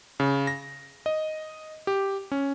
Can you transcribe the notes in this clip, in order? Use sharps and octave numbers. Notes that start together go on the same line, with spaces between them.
C#3
A#6
D#5
G4
C#4